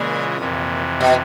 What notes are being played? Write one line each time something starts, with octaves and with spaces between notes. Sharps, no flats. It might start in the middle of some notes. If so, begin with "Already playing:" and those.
Already playing: A#2 C#3 E3 G#3
F2 C3 E3
B2